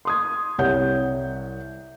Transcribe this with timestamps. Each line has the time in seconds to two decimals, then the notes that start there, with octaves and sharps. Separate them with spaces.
0.05 C6 D#6 G#6
0.58 C2 G4 C#5 F#5 G6